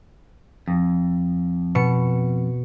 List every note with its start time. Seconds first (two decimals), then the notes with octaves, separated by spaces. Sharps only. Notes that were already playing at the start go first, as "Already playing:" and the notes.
0.68 F2
1.75 B2 C#7